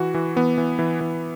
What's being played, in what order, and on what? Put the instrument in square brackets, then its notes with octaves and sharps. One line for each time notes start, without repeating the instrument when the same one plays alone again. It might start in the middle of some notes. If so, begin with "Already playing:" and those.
Already playing: [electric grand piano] E3 F#4
E3
E3 B3
E3
E3
E3